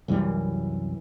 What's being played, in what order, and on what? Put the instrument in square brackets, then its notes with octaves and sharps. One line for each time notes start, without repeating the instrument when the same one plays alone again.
[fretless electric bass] C2 F#2 E3 G3